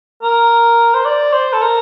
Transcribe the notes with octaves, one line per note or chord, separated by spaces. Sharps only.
A#4
C5
D5
C5
A4
A#4